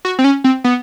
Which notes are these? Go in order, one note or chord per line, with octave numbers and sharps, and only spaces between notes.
F#4
C4
C#4
C4
B3